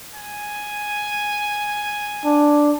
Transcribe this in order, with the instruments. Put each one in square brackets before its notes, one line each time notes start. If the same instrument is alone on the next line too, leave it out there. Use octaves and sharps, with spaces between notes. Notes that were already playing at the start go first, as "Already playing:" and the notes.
[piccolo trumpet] G#5
[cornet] D4